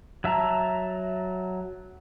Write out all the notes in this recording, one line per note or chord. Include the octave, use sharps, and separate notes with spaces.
F#3 E5 A5 A#5